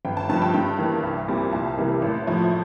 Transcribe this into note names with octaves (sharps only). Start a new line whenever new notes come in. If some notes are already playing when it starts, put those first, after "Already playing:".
G1 G5
A5
G2 F3 A5
G5
G2 G5
E3 A#3
C2
A#2 G3 C4
C2 A5
C3 E3 G3 A#3
A1
A2 F3